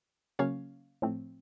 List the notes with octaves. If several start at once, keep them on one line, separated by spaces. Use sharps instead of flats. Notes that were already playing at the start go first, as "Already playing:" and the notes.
C#3 F#3 A#3 C#4 C#5 F5
A2 F3 A3 C4